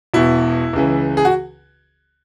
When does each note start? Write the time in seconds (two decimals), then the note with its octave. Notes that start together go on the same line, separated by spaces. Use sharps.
0.14 E1 E2 B2 E4
0.73 C#2 C#3 E3
1.17 G#4
1.25 F#4